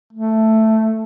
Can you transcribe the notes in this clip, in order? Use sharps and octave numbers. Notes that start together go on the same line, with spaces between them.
A3